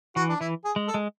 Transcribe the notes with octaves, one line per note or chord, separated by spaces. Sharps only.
E3 F#4
D4
E3 E4
G#4
G#3
A4
G#3